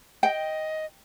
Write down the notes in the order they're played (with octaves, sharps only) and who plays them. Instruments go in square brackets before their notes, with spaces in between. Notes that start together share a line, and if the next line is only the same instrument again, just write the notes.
[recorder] D#5 [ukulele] G5